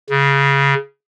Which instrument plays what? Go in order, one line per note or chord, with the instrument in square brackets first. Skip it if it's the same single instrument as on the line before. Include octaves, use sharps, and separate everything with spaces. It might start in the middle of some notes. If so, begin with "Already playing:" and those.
[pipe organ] C#3